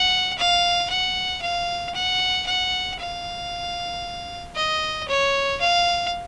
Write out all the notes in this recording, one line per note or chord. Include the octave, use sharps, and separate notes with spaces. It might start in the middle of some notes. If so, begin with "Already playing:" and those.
Already playing: F#5
F5
F#5
F5
F#5
F#5
F5
D#5
C#5
F5